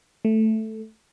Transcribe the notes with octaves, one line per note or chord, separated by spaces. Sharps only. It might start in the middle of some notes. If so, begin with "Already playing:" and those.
A3